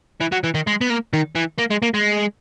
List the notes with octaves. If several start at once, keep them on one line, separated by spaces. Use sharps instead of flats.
E3
F#3
E3
D#3
G#3
B3
A#3
D#3
E3
A#3
G#3
A#3
G#3